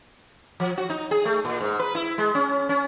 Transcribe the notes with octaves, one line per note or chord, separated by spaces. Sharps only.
F3
F#4
D#4
G#4
A3
A#2
G#2
B4
E4
G#3
C#4
C#4